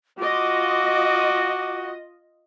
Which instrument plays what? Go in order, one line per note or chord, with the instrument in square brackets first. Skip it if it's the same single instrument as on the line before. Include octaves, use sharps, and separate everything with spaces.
[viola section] F4 D#5 [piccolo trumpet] F#4 [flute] D6